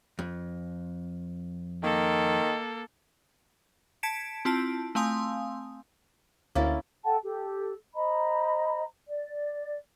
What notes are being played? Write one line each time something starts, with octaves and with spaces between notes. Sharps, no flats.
F2
D#3 A#3 A4
A5 G#6 B6 C#7 D7 E7
C4 E4 F4 A5 D7
A3 C4 F5 G#5 C6 D#6
D2 A#3 C#4 E4 A6
A4 F#5 G5 A5
G4 A4
C5 D#5 A#5 B5
D5